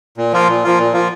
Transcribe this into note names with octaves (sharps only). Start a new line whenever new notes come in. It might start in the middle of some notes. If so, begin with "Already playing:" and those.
A#2
F3 A#3 F4
A#2
F3 A#3 F4
A#2
F3 A#3 F4